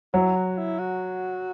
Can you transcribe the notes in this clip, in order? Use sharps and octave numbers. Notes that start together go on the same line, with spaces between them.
F#3 E4
F#4
E4
F#4